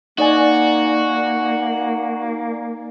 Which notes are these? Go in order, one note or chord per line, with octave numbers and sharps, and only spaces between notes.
A#3 D#4 F#4 D5 G#5